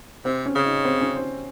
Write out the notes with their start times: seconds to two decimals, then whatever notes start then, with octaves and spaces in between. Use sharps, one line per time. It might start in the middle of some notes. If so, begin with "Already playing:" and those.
0.25 C3 C4
0.46 C#4
0.55 C#3
0.65 D#4
0.85 C4
1.01 C#4
1.16 C5